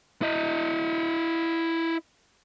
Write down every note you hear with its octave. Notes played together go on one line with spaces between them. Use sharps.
E4 D#5